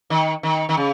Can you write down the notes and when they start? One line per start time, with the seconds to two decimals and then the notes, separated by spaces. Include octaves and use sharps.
0.10 D#3
0.43 D#3
0.69 D#3
0.77 C#3